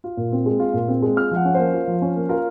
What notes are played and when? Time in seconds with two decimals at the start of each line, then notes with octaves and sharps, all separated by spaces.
0.04 F4
0.17 A#2
0.32 C4
0.46 G#3
0.59 F4
0.74 A#2
0.88 C4
1.02 G#3
1.16 F4 F6
1.31 F3 F#5
1.45 C#4
1.55 A#3 C5
1.74 F4
1.87 F3
2.02 C#4
2.16 A#3
2.29 F4 A#4